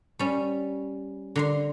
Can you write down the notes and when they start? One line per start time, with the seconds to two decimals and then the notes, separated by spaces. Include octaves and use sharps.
0.19 G3 C#4
1.36 D3 A#5 C6